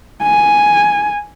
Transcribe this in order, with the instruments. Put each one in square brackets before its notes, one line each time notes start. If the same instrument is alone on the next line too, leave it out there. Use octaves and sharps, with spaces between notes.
[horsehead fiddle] G#5